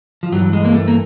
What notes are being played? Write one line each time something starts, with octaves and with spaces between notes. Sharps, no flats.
F3
G2 E3 F#3
G#3
A#3
A3
A#3